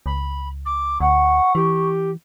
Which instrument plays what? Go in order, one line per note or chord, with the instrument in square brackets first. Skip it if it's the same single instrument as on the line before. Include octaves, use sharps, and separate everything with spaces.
[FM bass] C#2 [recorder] B5
[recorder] D6
[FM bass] D2 [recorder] F#5 [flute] C#6
[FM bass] E3 [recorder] G4